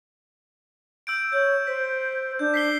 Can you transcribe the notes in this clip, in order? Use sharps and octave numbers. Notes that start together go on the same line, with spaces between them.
E6 G6 D7
C#5 G6
C5 B6
D4 G6
B6 C7 G7